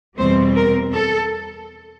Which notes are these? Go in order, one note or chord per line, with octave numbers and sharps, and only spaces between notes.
E2 B2 G3 C4 C5
A#4
A4